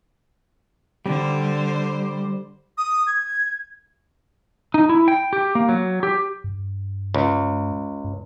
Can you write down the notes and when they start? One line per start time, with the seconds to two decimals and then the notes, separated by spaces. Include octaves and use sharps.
1.06 D3 G3 C5
2.78 D#6
3.07 G#6
4.74 D#4
4.89 E4
5.08 G5
5.33 G4
5.55 A#3
5.69 F#3
6.03 G4
6.44 G2
7.14 C#2
8.04 G2